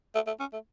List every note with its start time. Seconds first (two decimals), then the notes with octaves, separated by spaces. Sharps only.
0.15 A3
0.27 A3
0.40 C#4
0.53 A3